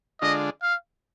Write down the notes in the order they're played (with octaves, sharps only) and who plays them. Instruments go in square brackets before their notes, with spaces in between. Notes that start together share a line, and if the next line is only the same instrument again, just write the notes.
[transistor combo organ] D3 G#3 D4 F4 [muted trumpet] D#5
[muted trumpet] F5